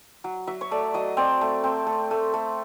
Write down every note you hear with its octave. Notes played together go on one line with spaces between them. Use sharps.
F#3
F#3 E5
C#5
A3 D5
F#3 D#5
C4 D5
A3
C4
A3
A3
A3